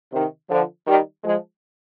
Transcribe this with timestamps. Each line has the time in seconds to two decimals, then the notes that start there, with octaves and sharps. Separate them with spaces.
0.12 C3 D#3
0.50 D3 F3
0.86 D#3 G3
1.24 F3 G#3